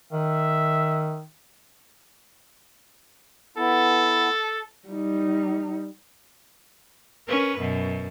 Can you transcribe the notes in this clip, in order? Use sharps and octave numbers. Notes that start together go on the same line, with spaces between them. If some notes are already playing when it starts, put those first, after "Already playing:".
D#3 E5
B3 E4 A4
G3 D#4
C#4 A#4 B4
F#2 B2